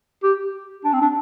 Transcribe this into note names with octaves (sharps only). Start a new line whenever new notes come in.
G4
D4
C4
D4